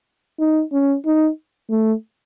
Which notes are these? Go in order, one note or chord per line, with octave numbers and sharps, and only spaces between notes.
D#4
C#4
D#4
A3